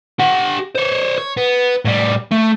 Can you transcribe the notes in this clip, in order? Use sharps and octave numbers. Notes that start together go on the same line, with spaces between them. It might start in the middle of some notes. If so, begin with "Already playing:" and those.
G4 F#5
C5 C#5
C#5
B3
A2 G3
A3